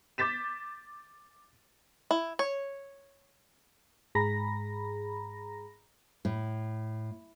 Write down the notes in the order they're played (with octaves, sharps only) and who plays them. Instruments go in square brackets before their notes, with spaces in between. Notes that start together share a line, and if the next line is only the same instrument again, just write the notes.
[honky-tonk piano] D6 G6 A6 B6 E7
[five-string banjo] E4
C#5
[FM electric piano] G#2 G#4 A#5 B5 A#6
[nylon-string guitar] A2